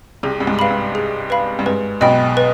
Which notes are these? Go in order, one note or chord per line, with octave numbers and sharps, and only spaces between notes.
C2 C3 G#4
G2
G#2
B4 F5 B5
G2
G#4
B4 F5 B5
G2
G#2 B4
B1 B2 D#5 G5 B5
B4